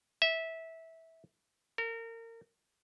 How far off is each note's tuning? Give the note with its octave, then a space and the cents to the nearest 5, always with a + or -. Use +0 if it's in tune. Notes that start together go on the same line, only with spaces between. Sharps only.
E5 -15
A#4 -30